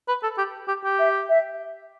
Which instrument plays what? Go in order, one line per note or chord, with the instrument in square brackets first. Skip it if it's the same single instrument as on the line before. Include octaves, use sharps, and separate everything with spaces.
[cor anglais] B4
A4
G4
G4
G4
[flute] E5
E5